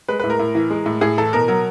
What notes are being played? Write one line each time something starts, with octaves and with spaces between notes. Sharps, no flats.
G#3 B4
A2 B4
A#4
A2
E3
G#3
A2
A2 G#4
E3 A4
B2 A#4
F#3 A#4